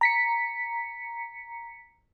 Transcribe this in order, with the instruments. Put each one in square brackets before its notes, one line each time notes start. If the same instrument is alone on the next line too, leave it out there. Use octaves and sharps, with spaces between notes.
[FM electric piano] A#5 B6 C#7